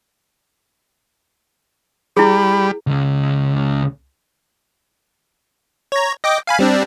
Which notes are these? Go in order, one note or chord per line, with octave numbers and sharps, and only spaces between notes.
G3 E4 G#4 B5
C#2 C#3
C#5 A#5
D#5 G5 D6
F5 G#5 B5
G3 C4 D4